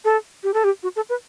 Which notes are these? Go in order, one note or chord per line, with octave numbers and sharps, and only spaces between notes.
A4
G4
A4
G4
F#4
A4
B4